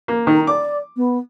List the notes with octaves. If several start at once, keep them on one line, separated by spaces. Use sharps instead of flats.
A#3
D#3 D#4
D5 D6
B3